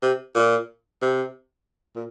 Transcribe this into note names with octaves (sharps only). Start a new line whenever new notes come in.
C3
A#2
C3
A#2